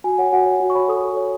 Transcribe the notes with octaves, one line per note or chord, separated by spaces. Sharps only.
F#4 G#5
C#5 F#5
F#4 F#5
C#5
F#4
C#6
C#5 B5
A4 D#6
A4
C#5